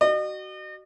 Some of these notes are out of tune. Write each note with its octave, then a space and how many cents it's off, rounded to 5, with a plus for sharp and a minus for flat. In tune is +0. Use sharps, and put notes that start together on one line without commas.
F#4 +25 D#5 -40